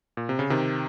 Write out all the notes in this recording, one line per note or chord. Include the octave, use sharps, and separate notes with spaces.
A#2
C3
C#3
C3 D#3